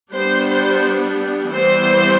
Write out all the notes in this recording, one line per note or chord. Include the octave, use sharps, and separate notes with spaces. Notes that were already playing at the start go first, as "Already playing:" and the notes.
G3 B3 D4 C5
C5
E3 G3 B3 C5